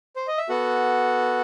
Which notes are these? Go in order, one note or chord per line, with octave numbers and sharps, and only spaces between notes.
C5
D#5
E5
B3 F#4 A4 F#5